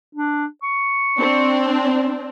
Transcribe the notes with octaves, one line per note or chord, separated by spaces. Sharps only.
D4
C#6
C4 D4